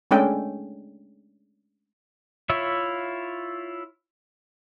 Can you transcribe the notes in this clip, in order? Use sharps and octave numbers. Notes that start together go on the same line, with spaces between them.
G#3 A3 C#4 D4 A4 G5
E4 F4 C#5 E5